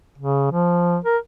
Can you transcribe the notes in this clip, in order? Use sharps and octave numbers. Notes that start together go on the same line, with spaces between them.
C#3
F3
A#4